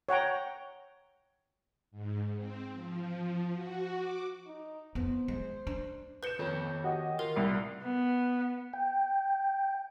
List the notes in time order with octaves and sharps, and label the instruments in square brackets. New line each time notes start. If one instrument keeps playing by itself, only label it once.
[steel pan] C#5 F#5 G5 A#5
[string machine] G#2
C4
F3
F#4
D6
[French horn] D#4
[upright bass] F2 B3 [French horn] C5
[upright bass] G#3
D4
[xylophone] B4 G7 [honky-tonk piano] G6 C#7 E7
[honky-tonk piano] F2 [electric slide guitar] D#3 C#5
[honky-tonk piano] F#4 G4 D#5
[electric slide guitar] F4 [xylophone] A#4
[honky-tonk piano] C2 G3 C7
[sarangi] B3
[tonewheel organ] G5